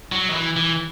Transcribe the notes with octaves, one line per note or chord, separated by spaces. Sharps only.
F#3
D#3
E3
E3